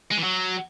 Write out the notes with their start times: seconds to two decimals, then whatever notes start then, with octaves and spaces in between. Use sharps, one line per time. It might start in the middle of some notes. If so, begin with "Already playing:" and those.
0.11 G#3
0.17 E3
0.23 F#3